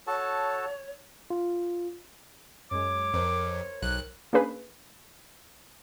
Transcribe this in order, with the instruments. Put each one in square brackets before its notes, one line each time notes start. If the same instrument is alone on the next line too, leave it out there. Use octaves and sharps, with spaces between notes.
[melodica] F#4 A4 A5 [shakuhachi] C#5
[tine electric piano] F4
[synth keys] F#2 G#3 [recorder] C#5 [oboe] D6
[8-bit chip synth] F2 [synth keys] A#4 C5
[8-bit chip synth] B1 F#6
[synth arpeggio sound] A#3 C#4 D4 G#4 B4